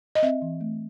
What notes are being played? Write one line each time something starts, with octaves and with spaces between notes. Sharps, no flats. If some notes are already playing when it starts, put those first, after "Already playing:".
D#5
C4 E5
E3
A3